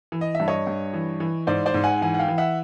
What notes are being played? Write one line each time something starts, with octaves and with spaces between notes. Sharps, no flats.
E3
D#5
E5
G2
C#5 D#5
G2
E3
E3
G#2 C5 D5
C5 D5
G#2
F#5 G#5
E3 F#5 G#5
F#5
F5 G5
E3
E5 F#5